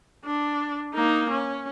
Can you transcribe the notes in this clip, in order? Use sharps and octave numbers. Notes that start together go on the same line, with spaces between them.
D4
A#3 D#4
C#4